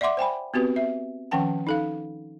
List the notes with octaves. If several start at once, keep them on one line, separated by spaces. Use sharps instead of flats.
D5 E5 F#5 C6 D6
C5 G5 G#5 B5
B3 C4 F#4 G4 B4
E5
D#3 F3 C#4 F#5 G5 A5
D#4 A4 F5